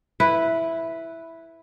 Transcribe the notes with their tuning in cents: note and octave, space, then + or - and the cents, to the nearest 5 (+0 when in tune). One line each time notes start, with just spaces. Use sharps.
E4 +0 B4 +0